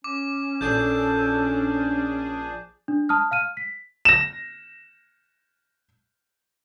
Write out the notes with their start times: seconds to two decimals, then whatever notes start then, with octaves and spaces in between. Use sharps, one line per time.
0.04 C#4 D6
0.61 A#1 D4 G#4 A4 G6
2.88 D4
3.09 A5 D#6 F6
3.31 F5 F6 D#7
3.57 B6
4.05 A#6 E7